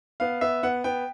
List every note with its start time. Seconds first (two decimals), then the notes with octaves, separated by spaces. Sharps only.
0.20 B3 F5
0.41 B3 E5
0.63 B3 F#5
0.84 B3 G5